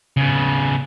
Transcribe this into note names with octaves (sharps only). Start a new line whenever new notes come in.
C#3 B3